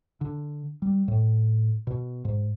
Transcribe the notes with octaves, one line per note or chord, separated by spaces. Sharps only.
D3
G3
A2
B2
G#2